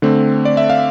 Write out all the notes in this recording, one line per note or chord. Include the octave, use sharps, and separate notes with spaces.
D3 A3 C4
D5
E5
F5